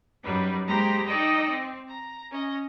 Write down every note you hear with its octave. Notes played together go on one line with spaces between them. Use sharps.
F#2 G3 D#4 B4
G#3 A#3 G4 C5 A#5 B5
D#4 A4 D5 D#5 G5 E6
C4
A#5
C#4 D#5